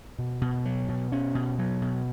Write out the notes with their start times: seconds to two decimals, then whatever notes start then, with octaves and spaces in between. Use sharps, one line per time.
0.18 B2
0.41 B2
0.65 F#3
0.89 B2
1.12 C#4
1.35 B2
1.58 F#3
1.82 B2